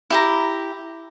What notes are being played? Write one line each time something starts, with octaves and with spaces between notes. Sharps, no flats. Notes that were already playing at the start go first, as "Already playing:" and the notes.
E4 G4 A#5